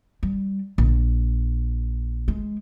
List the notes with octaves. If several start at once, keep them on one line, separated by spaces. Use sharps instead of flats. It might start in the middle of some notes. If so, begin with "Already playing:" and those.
G3
A#1
G#3